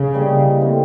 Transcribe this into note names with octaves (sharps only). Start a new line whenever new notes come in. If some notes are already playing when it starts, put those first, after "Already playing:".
Already playing: C#3 C#4
E3 G3 A#3 D#4
E3 A3 C4